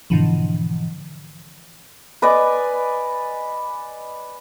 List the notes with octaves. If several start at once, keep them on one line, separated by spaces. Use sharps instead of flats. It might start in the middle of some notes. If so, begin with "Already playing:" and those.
G#2 B2 D3 E3 F3
B4 D5 D#5 G#5